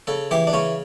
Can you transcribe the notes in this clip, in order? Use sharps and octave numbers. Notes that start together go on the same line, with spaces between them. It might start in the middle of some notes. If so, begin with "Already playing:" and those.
C#3 A4
E3 G4
D4
C#3 C#4